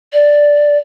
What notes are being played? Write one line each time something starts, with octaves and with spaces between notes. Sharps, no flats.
D5